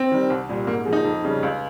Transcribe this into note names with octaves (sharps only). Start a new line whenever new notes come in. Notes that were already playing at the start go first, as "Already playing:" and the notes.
Already playing: C4
D#3 G3
C2
A#2 G3
G#2 A#3
F3 G#3
D#4
F2
C#3 G3
C#2